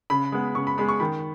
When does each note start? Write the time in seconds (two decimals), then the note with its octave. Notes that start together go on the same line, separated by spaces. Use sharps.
0.10 C#3 B5
0.32 G#3 B3
0.55 C#3 C#6
0.67 B5
0.77 G#3 B3 B5
0.89 C#6
1.00 D#3 B5